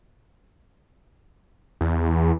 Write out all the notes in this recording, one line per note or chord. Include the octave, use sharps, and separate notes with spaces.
E2